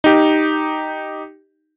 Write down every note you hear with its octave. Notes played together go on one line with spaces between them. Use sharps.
D#4 G4